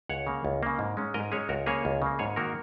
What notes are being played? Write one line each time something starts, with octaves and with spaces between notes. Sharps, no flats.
C#2 C#5 F#5
C#3 A#3
C#2
C#3 A#3
G#2
G#3 C#4
G#2 A#4 D#5
G#3 C#4 G#4 C#5
C#2 F#4 A#4
C#3 A#3 G#4 C#5
C#2
C#3 A#3
G#2 G#4 C#5
D#3 A#3 F#4 A#4